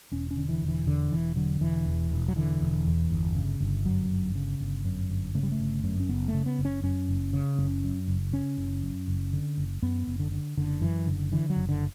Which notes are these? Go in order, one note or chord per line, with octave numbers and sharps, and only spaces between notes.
E1 C#4
C#4
D3
E3
E1
E3
E2 D3
E1 E3
D3 F#3
E1 E3
E2
E1
F#3
D3 E3
E1
E2
G1
C#3
G1
F#2 F#3
G1
C#3
G1
F#2
G1
C#3 A3
G3
A3
G1
F#2
C#4
F#1 B3
A3
C#3
B3
F#1
C#4
F#2 C#4
F#1
C#3
F#1 C#4
F#2
F#1
C#3 C#4
F#1
F#2
F#1
D3
F#1
F#2 B3
F#1
D3
D3
F#1 D3
F#2 E3
F#1 D3
D3 E3
F#3
F#1
D3